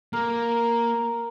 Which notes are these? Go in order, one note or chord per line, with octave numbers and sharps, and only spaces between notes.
A#3 A#4